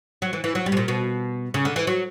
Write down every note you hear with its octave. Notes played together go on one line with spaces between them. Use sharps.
F#3
E3
E3
F#3
G3
B2
A#2
B2
C#3
D3
E3
F#3